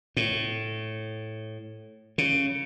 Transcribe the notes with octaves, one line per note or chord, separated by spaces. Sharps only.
A2
C#3